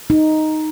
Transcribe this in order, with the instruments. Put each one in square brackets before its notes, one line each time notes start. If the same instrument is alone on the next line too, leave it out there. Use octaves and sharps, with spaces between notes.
[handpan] D#4